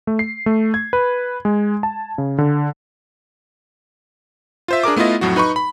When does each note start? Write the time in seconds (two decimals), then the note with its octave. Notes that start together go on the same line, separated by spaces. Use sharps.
0.07 A3
0.19 C7
0.46 A3
0.74 G#6
0.93 B4
1.45 G#3
1.83 A5
2.18 C#3
2.38 D3
4.68 F4 C5 E5
4.83 D4 G#4 A#4 D6
4.96 A3 B3 E4 F4 D#5
5.21 F2 A2 F#3 F#4
5.36 D#4 B4 B5 C#6
5.56 B5